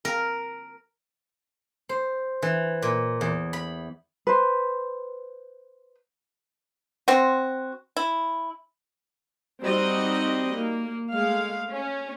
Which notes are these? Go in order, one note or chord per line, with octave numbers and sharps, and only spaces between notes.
A#4
C5
E3
A#2
E2
B5
B4 C5
C4 F#4
E4
G3 C4 D#4 F#4 D#5
A#3
G#3 A3 F5
C#4